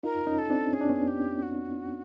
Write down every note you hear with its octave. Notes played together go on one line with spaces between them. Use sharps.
D#4 F4 A#4
C#4 D#4
A4
C4 D4
C#4 G#4
D4
B3 C#4
G4
F#4